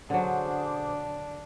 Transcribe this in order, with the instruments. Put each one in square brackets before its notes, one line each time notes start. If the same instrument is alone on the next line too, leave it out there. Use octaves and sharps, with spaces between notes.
[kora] D3 F#3 [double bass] D4 [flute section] G#4 C5 D6